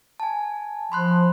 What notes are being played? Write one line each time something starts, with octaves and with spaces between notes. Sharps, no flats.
G#5 A5
F3 B5 C6 F#6